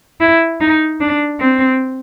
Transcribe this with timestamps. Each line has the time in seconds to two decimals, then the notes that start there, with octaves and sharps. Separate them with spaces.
0.20 E4
0.61 D#4
1.00 D4
1.40 C4